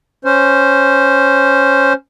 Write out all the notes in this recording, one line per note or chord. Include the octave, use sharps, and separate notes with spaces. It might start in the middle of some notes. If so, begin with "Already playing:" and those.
C#4 C5